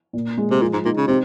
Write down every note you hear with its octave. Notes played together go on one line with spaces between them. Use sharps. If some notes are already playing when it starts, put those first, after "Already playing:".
A#2
G#3
C3
A#2 F3
G#2
A#2 D#4
C#3
C3 C4